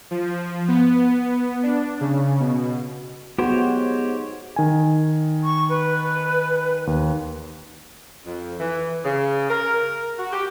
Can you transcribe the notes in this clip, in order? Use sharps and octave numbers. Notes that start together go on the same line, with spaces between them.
F3
B3
D4
C#3
B2
G#2 B3 F#4 G4 C5 C#5
D#3 G#5
C#6
B4
D#2
F2
E3
C#3
A#4
F#4
G4